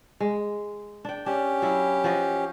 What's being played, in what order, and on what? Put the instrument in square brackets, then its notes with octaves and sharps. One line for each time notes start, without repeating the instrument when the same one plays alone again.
[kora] G#3
D4 G5
[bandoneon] C#4 G4 [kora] D4
[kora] F#3 E4
F3 F#4 D#5